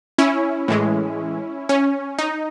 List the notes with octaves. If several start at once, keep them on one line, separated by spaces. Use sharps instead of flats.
C#4 E4
A2 E3 G#3
C#4
D#4